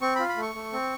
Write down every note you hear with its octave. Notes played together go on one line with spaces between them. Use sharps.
C4 C#6
F4 B5
B5
A3
C#6
A3
C4